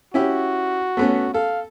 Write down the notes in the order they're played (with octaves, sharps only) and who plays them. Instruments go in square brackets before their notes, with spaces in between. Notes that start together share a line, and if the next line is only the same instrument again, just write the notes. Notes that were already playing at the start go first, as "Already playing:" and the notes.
[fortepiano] C#4 E4 G4 [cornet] F#4
[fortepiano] A3 B3 C#4
[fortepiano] A4 [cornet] F5